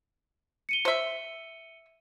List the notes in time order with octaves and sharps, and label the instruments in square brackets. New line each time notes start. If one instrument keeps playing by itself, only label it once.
[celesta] C#7 D#7 G7
[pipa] C5 E5